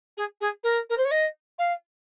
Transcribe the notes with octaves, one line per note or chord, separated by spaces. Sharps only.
G#4
G#4
A#4
A#4
C5
C#5
D#5
F5